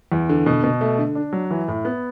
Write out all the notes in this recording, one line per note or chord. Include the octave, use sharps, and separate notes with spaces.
E2
D3
B2
B2
A3
D3
D4
F#3
E3
A2
B3